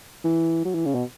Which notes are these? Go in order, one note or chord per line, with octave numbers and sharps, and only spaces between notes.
E3
F#3
E3
C#3
B2